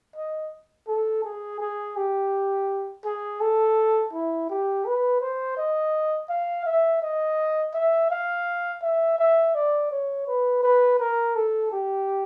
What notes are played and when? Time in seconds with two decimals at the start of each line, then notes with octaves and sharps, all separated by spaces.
0.16 D#5
0.88 A4
1.24 G#4
1.60 G#4
1.96 G4
3.05 G#4
3.41 A4
4.13 E4
4.49 G4
4.85 B4
5.21 C5
5.57 D#5
6.29 F5
6.66 E5
7.02 D#5
7.74 E5
8.10 F5
8.82 E5
9.19 E5
9.55 D5
9.91 C#5
10.27 B4
10.63 B4
10.99 A#4
11.35 A4
11.72 G4